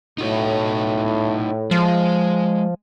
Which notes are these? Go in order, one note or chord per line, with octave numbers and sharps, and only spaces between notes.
A2 D#4 F#4 C#5
F3 G#3 G#4